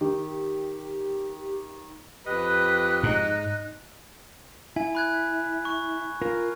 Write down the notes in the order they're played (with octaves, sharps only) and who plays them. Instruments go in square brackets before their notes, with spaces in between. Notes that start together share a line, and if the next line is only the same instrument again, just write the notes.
[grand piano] D#3 [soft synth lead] G4
[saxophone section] F2 G4 D#5 [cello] B4 [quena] F#6
[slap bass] G#2 [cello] D#4
[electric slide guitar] E4 [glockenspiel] G#5
[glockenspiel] B5 F#6 G#6
C#6
[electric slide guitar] F4 A#4